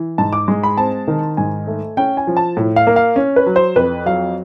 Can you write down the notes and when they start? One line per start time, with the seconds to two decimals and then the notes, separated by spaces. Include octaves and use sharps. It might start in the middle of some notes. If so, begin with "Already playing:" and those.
Already playing: E3
0.18 G#2 A5
0.33 D6
0.48 G#3
0.63 B5
0.77 C4 A5
1.08 D#3
1.37 G#2 G#5
1.67 A3
1.97 C#4 G5
2.17 G#5
2.27 F3
2.37 A5
2.57 A2
2.76 F5
2.87 A#3
2.96 F5
3.16 C#4
3.36 B4
3.46 F#3
3.56 C5
3.76 F2 B4
4.06 F#3 F5